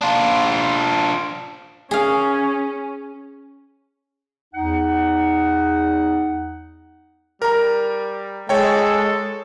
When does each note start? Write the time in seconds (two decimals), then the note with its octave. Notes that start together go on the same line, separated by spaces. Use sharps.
0.01 D4 F4
1.91 C#4 G#4 F5
4.54 E2 D#4 F#5
7.42 G3 A#4 A#5
8.49 G#3 A4 C#5 G5